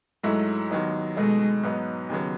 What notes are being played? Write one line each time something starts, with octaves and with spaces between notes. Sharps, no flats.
G#2 F#3 G#3 A3 E4
D#2 D#3 F#3 B3 D#4
B2 G#3 A3 D#4
G#2 F#3 B3 D#4
D#2 C#3 F#3 B3